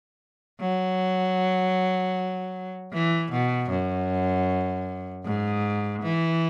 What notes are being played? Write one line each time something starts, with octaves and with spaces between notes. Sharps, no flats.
F#3
E3
B2
F#2
G#2
E3